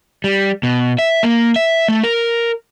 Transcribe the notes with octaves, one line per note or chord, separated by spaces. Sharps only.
G3
B2
E5
A#3
E5
A3
A#4